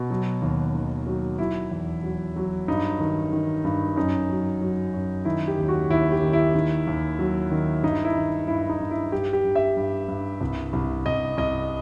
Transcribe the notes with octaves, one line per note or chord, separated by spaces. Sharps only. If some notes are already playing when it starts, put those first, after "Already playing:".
Already playing: B2
F#3
D#2
D#3
F#3
F#3 E4
E2
F#3
F#3
G2 D#4
D#3
D#3
G2
F#2 D#4
F#3
F#3
F#2
D#3 E4
G4
D#2
F#4
D#2 E4
G4
D#3
E4
D#3
D#2
F#3
D#3
G2 D#4
E4
D#3
G2 E4
D#4
G2
E4
G2 G4
G4
G2
E5
G2
G2
C2
C2
C2 D#5
C2 D#5